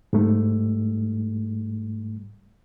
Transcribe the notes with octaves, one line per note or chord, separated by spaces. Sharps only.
G#2 G3 A3